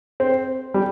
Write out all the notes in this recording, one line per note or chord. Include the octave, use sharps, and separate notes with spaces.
C4
G3